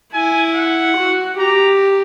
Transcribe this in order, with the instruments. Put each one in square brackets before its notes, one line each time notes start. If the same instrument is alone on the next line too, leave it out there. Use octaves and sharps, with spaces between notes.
[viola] E4 [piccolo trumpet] G#5
[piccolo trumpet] F#5
[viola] F#4
[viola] G4 [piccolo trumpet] A#5